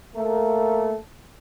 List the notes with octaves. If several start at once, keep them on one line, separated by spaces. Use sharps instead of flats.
A3 A#3